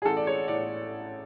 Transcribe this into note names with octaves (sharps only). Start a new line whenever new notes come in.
G#4
A1 A4
D5
G#3 C#5
A2 D5